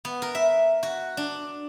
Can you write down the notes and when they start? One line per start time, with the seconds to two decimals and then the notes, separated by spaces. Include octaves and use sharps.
0.05 B3
0.22 A#4
0.35 E5
0.83 F#4
1.17 D4